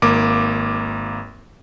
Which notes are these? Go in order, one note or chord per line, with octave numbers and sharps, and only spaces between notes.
G#1 A#3 D6